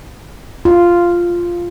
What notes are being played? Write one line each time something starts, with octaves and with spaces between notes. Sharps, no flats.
F4